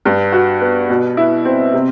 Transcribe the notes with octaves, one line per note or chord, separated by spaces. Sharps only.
G2
F#4
B3
B2
E4
C4
C3